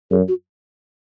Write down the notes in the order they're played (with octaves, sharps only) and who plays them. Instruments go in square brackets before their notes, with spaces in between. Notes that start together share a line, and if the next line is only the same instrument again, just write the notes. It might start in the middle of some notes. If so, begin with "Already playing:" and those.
[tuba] F#2 [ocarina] G#4
[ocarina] F#4